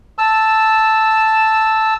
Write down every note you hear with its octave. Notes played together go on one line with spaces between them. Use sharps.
A5 E6